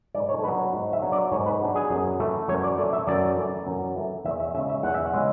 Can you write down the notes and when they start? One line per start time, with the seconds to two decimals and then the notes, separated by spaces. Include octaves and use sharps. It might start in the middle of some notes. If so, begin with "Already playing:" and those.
0.14 G#2 D5
0.29 C#5
0.39 A4
0.44 F#3 B3 D4 B4
0.59 C#5
0.73 G#2
0.93 E5
1.02 F#3 B3 D4
1.12 D5
1.31 G#2 C#5
1.46 B4
1.61 F#3 B3 D4
1.75 G#4
1.90 F#2
2.20 E3 A3
2.48 F#2 C#5
2.63 D5
2.78 E3 A3 D5
2.93 E5
3.07 F#2 D5
3.37 E3 A3
3.67 F#2
3.96 E3 A3
4.25 E2 E5
4.40 E5
4.54 C#3 G#3 C#4 E5
4.69 E5
4.83 E2 F#5
4.94 E5
5.06 F#5
5.14 C#3 G#3 C#4